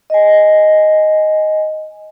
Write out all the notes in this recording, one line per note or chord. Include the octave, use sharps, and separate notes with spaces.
D#5 G#5